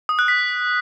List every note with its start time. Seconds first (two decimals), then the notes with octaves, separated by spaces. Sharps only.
0.09 D#6
0.19 F#6
0.28 B6